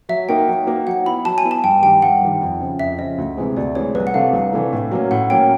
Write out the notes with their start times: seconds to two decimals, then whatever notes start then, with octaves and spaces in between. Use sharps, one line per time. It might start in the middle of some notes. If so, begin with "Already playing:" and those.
0.09 F#3 E5
0.28 A#3 D#4 F#4 A#4 G5
0.48 F#3
0.67 A#3 D#4 F#4 A#4
0.87 F#3 F#5
1.06 B3 E4 B5
1.25 F#3 A5
1.38 G#5
1.45 B3 E4
1.51 A5
1.64 G2 G5
1.82 D#3 G3 G5
2.02 G2 F#5
2.21 D#3 G3
2.41 F2
2.60 C#3 F3
2.79 F2 E5
2.99 C#3 F3 D#5
3.18 D2
3.37 C3 E3 G#3 C4
3.57 D2 D5
3.75 C3 E3 G#3 C4 C#5
3.95 C2 B4
4.07 F#5
4.14 C3 E3 A3 D4 F5
4.33 C2
4.53 C3 E3 A3 D4
4.73 A2
4.91 F#3 A#3 C#4
5.11 A2 F#5
5.30 F#3 A#3 C#4 G5